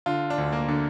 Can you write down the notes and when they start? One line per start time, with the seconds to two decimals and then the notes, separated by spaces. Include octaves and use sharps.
0.06 D3 F4
0.30 D4
0.38 D2
0.52 A#3
0.68 D3